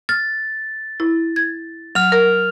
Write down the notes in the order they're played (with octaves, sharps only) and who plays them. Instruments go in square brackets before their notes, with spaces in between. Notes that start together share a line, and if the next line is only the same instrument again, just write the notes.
[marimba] F6 [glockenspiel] A6
[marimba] E4
G#6
[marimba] F#3 [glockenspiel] F6 F7
[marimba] A#4